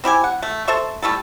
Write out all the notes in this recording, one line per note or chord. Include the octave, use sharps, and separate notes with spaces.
C4 E4 G4 G#5
F#5
A3
A4 C5 E5 C#6
G3 A3 E4 A4